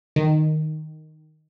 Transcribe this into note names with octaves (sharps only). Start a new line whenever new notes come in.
D#3